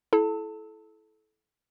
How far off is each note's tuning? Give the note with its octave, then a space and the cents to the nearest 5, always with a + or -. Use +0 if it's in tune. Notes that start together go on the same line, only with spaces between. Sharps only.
E4 +0 A4 -25 A5 +30